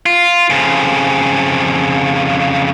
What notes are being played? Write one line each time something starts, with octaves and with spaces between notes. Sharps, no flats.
F4
F2 C#3